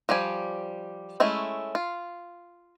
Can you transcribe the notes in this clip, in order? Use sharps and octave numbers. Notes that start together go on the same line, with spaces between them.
F3 G3 G4 G#5
G#3 A3 C#4 E4
F4